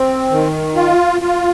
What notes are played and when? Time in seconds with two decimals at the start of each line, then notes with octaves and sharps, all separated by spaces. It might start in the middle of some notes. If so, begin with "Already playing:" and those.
Already playing: C4
0.31 D#3
0.76 F4
1.21 F4